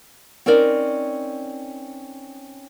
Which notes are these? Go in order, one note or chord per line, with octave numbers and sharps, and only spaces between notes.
C4 C#4 D#4 A#4 D5